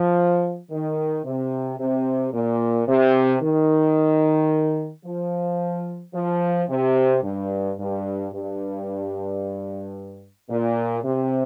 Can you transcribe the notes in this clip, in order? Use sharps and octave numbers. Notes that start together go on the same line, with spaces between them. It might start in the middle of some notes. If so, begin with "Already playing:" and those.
Already playing: F3
D#3
C3
C3
A#2
C3
D#3
F3
F3
C3
G2
G2
G2
A#2
C3